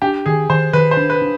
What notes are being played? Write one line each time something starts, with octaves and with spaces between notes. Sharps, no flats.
D4 G4
D#3 G#4
D#3 C5
D#3 B4
C5
D4
B4
D4